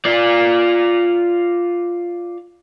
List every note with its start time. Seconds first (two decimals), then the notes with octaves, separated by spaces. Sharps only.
0.05 F4 D5